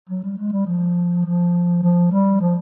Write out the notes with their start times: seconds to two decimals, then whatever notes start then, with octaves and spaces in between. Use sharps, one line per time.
0.09 F#3
0.23 G3
0.38 G#3
0.52 G3
0.66 F3
1.25 F3
1.83 F3
2.12 G3
2.41 F3